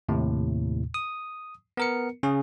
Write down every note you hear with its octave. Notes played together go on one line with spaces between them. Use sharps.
D#2 A2 C3
D#6
B3 A#4 C#7
C#3 C#4 G#4